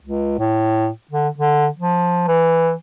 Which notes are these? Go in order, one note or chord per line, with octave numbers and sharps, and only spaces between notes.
C#2
A2
D3
D3
F3
E3